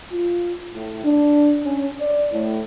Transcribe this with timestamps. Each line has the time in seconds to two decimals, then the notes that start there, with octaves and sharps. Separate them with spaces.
0.13 F4
0.74 A2
1.05 D4
1.65 C#4
2.01 D5
2.33 A2